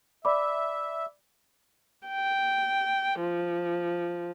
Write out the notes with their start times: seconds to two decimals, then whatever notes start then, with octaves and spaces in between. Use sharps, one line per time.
0.25 D5 E5 B5 D6
2.07 G5
3.19 F3